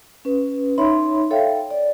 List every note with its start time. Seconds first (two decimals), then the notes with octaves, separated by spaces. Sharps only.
0.25 C#4 B4
0.78 D#4 C#5 E5 B5 C6
1.31 A4 C#5 E5 F5 G5
1.71 D5